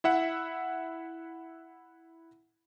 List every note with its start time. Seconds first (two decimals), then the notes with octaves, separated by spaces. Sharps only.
0.04 E4 E5 F#5